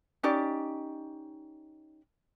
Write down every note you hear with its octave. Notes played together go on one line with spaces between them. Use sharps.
C#4 D#4 G4 D5